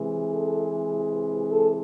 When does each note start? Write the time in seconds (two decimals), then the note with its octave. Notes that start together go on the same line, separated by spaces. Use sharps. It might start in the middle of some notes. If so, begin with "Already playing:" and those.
Already playing: C3 E3 G#3
0.31 A4
1.51 A4